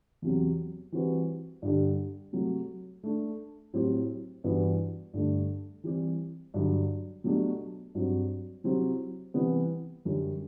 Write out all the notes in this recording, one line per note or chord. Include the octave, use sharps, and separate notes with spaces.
E2 C3 F#3
E3 G3 C4 F#4 B4
G2 D3 G3
C3 F#3 A3
A3 D4 A4
A2 F#3 C4 E4 G4
G2 E3 B3 F#4 B4
G2 D3 A3
E3 G3 C4 G4
G2 D3 F#3
B2 F#3 A3 D4 G4
G2 F#3 C4 F#4
C3 F#3 C4 E4 G4
C3 E3 G3 B3
F#2 D3 G3